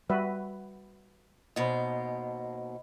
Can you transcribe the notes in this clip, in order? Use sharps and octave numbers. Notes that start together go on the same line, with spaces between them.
G3 F#4 B4 E5
D#2 B2 C5 D#5 B5